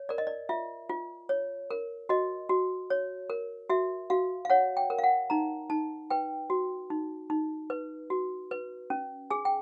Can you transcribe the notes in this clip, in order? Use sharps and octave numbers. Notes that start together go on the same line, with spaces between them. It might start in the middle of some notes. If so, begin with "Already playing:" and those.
Already playing: C#5
A#4 D5
D#5
D5
F4 E5
F4
C#5
A#4
F#4 D#5
F#4
C#5
A#4
F#4 E5
F#4 F5
F5
C#5 F#5
G5
A#4
F5
F#5
D#4 A#5
D#4 A5
B4 G5
F#4
D#4
D#4
B4
F#4
B4
C#4
G#4 G#5
G5